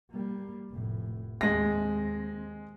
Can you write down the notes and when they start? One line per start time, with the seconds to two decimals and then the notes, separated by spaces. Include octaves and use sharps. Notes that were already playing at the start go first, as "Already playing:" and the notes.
0.11 G3 A#3
0.70 F1 A2
1.41 D#2 G#3 C4 A#6